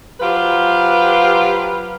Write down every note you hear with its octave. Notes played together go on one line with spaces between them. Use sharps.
F#3 F4 G4 B4 C5